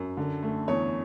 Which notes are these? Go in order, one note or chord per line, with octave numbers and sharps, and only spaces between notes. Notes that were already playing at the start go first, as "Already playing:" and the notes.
Already playing: F#2
D3
A3
E2 C#5